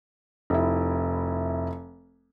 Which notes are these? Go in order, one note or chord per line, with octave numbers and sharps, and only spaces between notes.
F1 E4